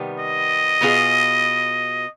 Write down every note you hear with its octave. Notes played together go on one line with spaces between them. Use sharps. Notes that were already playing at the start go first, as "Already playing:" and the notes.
Already playing: C3 D#3 G3 B3
D#5
B2 B3 F4 G#4